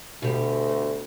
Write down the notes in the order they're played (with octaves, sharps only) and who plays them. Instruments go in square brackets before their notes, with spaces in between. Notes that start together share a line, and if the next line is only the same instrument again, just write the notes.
[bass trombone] D2 [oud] B2 G4